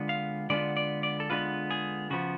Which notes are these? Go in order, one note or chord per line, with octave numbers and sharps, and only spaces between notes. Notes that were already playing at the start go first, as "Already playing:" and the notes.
Already playing: D3 G#3 B3 D4 F4
F5
D3 G#3 B3 D4 F4 D5
D5
D5
A4
D3 G#3 B3 D4 F4 B4
G#4
C#3 F3 B3 F#4